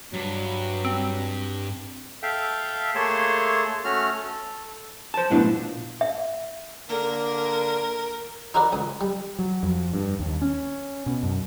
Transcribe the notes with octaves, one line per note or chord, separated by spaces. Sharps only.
G2 F#3
C4
A4 E5 F5 G5
A3 A#3 G#4 C#5 A5 C6
A3 C#4 F#4 F6
A4
C5 A5
B1 F#2 A2 B3 D4 E4
A#2
E5
D3 A#3 A#4
D#4 E4 F#4 A#4 B4 D5
C#2 D#6
G3
F#3
F2
G2
D#2
C#4
B2
F#2